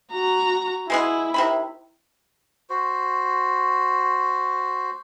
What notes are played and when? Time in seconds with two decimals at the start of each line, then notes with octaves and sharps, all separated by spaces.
0.13 F#4 A#5
0.90 G#3 B3 E4 G#4
1.34 C3 D#3 B5
2.70 F#4 C5